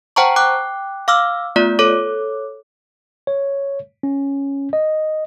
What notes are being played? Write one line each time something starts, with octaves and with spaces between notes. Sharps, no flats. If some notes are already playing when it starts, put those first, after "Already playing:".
C5 F#5 G5 A5 A#5 C#6
G5 D6 F#6
F5 D6 E6 F6
A3 B3 F4 D5
A4 C#5 D6
C#5
C#4
D#5